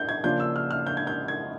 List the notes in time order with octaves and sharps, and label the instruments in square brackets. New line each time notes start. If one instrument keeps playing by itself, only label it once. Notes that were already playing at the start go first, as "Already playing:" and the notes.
Already playing: [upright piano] G6
G#6
C#3 F3 A#3 D4 F4 G6
E6
F6
F6
G6
G#6
G6
G#6